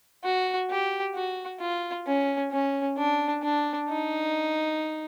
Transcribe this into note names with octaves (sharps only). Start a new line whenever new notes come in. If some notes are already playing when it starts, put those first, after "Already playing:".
F#4
G4
F#4
F4
C#4
C#4
D4
D4
D#4